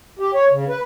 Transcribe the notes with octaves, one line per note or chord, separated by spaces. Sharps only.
G4
C#5
C#3
B4